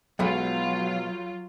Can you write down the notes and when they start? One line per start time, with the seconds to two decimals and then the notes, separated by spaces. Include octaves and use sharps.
0.19 B1 B2 F#3 G#3 B3 F4